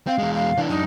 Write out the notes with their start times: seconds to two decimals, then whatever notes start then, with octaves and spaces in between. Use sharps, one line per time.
0.07 C4 F5
0.19 E2 G#3
0.34 F5
0.58 E3 D4
0.69 F#2 D4 D#4